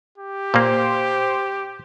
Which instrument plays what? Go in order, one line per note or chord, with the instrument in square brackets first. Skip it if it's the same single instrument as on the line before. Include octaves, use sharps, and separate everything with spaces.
[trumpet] G4
[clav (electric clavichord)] A#2 A#3 [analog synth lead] C5